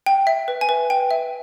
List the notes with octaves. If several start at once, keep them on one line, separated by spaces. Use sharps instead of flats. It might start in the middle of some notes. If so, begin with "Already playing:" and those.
G5
E5
B4
G#5
B4
G5
E5